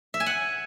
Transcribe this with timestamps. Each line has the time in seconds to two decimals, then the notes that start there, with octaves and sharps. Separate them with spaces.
0.14 E5
0.20 G#5
0.26 F#5